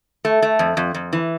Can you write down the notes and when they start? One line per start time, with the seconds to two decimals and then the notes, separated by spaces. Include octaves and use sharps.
0.25 A3
0.42 A3
0.59 F2
0.77 F2
0.94 F2
1.13 E3